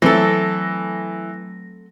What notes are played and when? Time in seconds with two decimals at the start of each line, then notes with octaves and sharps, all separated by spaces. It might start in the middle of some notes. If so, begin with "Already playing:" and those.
0.02 E3 F#3 A3 C4 A4 A#6